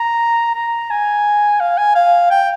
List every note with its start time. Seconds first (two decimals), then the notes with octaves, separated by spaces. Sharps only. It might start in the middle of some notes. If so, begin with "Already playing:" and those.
Already playing: A#5
0.54 A#5
0.90 G#5
1.60 F5
1.78 G#5
1.95 F5
2.31 G5